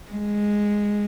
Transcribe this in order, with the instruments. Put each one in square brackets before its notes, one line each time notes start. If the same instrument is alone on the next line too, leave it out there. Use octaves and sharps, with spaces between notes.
[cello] G#3